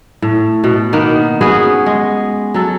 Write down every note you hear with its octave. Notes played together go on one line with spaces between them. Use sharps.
A2
B2
D#3 A#3 B3
B3 C#4 F#4 G#4
G#3
F#3 A4